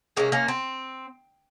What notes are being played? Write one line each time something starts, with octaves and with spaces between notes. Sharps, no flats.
C3 D#3 G#3 A#3 C#4
A#3 C#4
C4